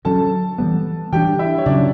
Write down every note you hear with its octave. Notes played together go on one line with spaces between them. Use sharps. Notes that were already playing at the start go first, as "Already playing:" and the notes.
D3 F#3 C#4 A4 A5
E3 G3 B3
E3 G3 D4 G4 G5
E4 E5
C#5
C#3 F#3 C#4 D4 D5